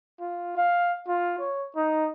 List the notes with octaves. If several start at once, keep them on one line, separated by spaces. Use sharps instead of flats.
F4
F5
F4
C#5
D#4